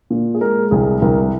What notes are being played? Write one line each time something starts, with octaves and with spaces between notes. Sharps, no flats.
A#2
G#4
G#3 A#4
C2 G#4
C2 A#4